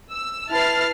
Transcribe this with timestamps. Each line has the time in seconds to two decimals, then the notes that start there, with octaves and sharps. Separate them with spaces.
0.11 E6
0.50 E4 B4 A5 F6 A6 C7